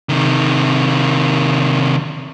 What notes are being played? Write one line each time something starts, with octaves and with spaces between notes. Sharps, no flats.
C3 D#3